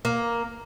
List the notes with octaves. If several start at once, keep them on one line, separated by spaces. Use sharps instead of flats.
A#3